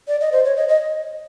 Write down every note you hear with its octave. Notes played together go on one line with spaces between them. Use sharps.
D5
D#5
C5
C#5
D#5
D#5